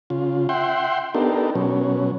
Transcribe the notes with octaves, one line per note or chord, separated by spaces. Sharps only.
C#3 F4
E5 F#5 G5 C6
B3 D4 D#4 G4 A4 A#4
B2 F#3 C#4